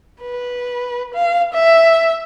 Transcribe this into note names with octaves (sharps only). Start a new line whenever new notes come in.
B4
F5
E5